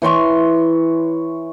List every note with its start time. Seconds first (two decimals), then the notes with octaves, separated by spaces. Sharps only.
0.02 E3 C#5 C6 C#6